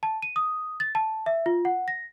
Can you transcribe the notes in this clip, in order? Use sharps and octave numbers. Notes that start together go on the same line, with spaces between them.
A5
D#7
D#6
A6
A5
E5
F4
F#5
A#6